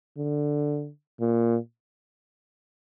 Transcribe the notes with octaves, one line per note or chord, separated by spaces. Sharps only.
D3
A#2